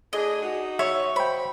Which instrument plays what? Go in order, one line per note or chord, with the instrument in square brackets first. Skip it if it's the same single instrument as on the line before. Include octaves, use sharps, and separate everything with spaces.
[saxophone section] A2 D4 G#4 [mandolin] D#5
[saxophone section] D#4 F#4
[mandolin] C#5 [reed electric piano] E5
[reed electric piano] C5 G5 [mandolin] B5